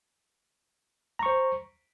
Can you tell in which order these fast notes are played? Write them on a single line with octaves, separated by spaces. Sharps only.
A#5 C#6 C5